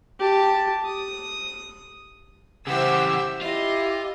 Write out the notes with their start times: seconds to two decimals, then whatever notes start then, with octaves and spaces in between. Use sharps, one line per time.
0.19 G4 A5
0.85 D#6
2.67 C#3 E3 G4 C5 E5 F#5 E6
3.42 E4 F4 G4 D#5